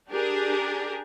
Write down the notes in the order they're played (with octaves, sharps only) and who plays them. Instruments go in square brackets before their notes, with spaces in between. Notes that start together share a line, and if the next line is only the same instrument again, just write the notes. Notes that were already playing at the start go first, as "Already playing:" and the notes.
[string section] D4 G4 G#4 A#4